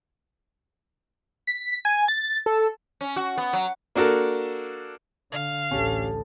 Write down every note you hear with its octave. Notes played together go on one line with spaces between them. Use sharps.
B6
G#5
A6
A4
C#4
F#4
B3
F#3
A#3 D4 F#4 A4 A#4
D3 F5
A1 D2 C#4 G4 A4 A5